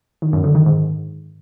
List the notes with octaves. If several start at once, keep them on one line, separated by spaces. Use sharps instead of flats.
D#3
F#2
D3
D#3
G#2